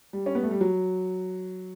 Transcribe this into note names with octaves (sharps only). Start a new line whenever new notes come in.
G3
C#4
B3
A3
G3
F#3